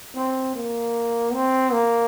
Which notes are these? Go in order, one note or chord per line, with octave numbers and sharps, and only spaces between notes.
C4
A#3
C4
A#3